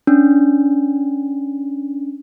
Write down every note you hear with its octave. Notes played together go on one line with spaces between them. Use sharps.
C#4 D4